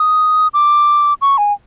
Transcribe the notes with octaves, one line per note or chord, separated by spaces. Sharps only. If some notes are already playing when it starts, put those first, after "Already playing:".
Already playing: D#6
D6
C#6
G#5